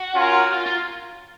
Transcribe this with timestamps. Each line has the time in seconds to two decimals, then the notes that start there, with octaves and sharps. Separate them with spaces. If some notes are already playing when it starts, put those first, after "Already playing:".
Already playing: F#4
0.15 C#4 F4 A#4
0.53 F4
0.66 F4